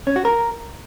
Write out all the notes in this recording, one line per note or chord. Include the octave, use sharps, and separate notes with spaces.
C#4
F#4
A#4